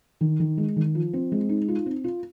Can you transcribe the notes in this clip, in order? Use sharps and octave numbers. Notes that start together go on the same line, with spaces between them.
D#3
D#3
G#3
D#3
F3
C4
G#3
D#4
F4
C4
F4